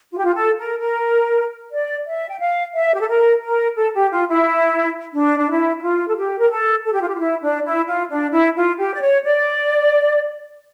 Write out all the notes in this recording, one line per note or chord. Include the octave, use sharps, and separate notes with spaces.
F4
G4
F4
A4
A#4
A#4
D5
E5
G5
F5
E5
G4
A4
A#4
A#4
A4
G4
F4
E4
D4
D4
E4
E4
F4
A4
G4
A#4
A4
A4
G4
F4
G4
F4
E4
D4
E4
F4
D4
E4
F4
G4
D5
C#5
D5